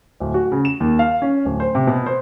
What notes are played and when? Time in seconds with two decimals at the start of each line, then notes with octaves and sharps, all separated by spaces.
0.20 D1
0.34 F#4
0.52 C#3
0.65 E7
0.80 D#2
0.99 F5
1.22 C#4
1.45 D1
1.60 C5
1.75 C3
1.87 B2
2.06 C5